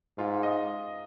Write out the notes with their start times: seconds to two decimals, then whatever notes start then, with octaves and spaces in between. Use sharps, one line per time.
0.18 G#2 F4
0.43 D#5